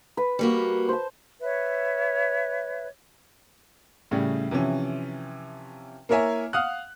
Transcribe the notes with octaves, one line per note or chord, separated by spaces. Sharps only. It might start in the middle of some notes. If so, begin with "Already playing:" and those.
B4
G3 A#3 F#4
C5 A5
B4 C#5 E5
A2 C#3 G3
C3 E3 F3 C#4
A#3 E4 A#4 C#5 E5 G#5
F5 F#5 D#6 F6 F#6